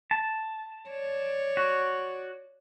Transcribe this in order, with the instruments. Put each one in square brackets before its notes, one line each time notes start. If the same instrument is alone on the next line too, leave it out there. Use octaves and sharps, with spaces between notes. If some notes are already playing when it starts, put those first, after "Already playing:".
[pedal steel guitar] A5
[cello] C#5 D5
[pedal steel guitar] F#4